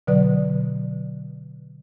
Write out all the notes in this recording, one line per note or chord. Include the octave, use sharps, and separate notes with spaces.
B2 D3 F#3 B4 D5